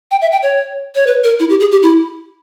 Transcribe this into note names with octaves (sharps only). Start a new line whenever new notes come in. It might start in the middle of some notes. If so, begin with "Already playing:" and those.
G5
E5
G5
C#5
C#5
B4
A#4
E4
G4
G#4
G4
E4